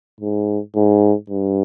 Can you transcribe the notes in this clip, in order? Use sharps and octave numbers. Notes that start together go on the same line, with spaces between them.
G#2
G#2
G2